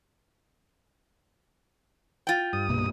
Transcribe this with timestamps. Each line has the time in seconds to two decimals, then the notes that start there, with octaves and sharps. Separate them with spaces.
2.27 F4 G5
2.53 G2 D#6
2.69 C2 B2 A#3